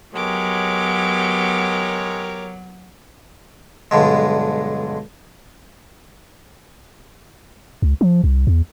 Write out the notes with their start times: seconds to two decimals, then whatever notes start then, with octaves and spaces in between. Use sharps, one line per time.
0.15 F#3 G#3 B3 G4 A#4 C#5 D6
3.91 B1 G2 D3 G#3
7.82 C#2
8.01 F3
8.24 C2
8.47 E2